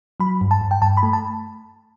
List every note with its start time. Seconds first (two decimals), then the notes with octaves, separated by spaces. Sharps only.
0.20 F#3 B5
0.41 G2
0.51 A5
0.61 G2
0.71 G5
0.82 G2 A5
0.97 B5
1.03 A3
1.13 A5